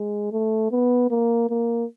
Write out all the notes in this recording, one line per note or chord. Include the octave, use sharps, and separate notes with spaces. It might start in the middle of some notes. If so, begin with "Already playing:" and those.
Already playing: G#3
A3
B3
A#3
A#3